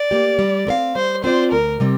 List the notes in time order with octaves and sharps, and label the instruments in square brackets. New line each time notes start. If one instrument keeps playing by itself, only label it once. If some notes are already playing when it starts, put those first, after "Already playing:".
Already playing: [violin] D5
[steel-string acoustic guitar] A#3 G4
G3
C4 A#4 F5
[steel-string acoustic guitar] G3 [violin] C5
[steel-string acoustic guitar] C4 F4 D5 [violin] C5
[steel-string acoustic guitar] D2 [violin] A#4
[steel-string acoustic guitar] C3 G3 C4